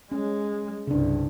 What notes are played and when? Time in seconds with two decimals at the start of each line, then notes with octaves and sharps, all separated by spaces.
0.12 G#3 C#4
0.87 C2 G2 C#3 D4